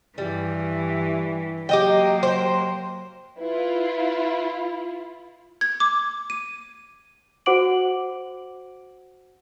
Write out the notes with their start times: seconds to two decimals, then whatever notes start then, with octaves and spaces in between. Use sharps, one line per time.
0.18 G2 E3 G3
1.69 F#3 A#3 G4 D#5 G5
2.23 C5 G5
3.39 E4 F4 B4
5.61 G#6
5.80 D6
6.30 D#7
7.46 F#4 C5 F#5 D6 D7 F#7